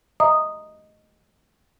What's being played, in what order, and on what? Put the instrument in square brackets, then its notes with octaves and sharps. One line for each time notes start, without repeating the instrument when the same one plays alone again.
[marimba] D#5 E5 A#5 D#6